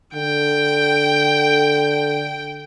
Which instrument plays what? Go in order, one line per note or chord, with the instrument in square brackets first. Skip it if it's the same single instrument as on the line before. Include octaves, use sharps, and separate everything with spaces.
[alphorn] D3 [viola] G5